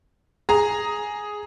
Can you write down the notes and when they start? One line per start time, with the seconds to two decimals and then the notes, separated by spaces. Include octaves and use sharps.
0.49 G#4 A#5